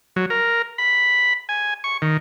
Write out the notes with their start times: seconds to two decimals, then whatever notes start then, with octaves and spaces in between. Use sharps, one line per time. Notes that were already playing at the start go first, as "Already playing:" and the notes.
0.16 F#3
0.30 A#4
0.78 B5
1.49 G#5
1.84 C#6
2.02 D#3